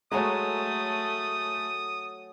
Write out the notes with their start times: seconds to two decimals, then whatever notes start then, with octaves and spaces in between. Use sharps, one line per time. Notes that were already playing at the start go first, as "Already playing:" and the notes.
0.12 F#3 G#3 A3 G#4 C#5 A#5 D#6